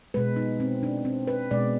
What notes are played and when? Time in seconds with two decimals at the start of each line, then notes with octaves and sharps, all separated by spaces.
0.14 B2 G#3 B4
0.36 D#4
0.60 C4
0.83 D4
1.05 C4
1.27 B4
1.51 B2 G#3 D5